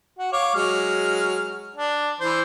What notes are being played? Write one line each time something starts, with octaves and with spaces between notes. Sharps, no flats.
F#4
C#5 F5 D6
F#3 G#3 F6
D4
E3 C5